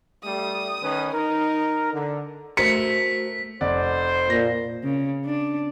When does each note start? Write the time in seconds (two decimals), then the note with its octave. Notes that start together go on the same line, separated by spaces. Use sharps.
0.24 G3 A3 D#6
0.82 D#3 C#4 B4
1.12 D#4 A#4
1.93 D3
2.57 A3 F#4 A#4 C5 B6 C#7
3.61 F1 C5 D5 F#5
4.30 A#2 A#6
4.84 C#3
5.25 D4